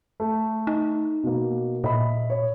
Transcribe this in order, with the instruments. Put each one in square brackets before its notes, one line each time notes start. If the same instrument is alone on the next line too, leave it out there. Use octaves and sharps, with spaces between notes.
[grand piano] A3
[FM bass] D#4
[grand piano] B2 A#3
[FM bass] A#2 [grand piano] D#5 E5 B5
[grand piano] C#5